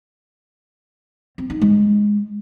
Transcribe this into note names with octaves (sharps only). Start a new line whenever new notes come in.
C4
D#4
G#3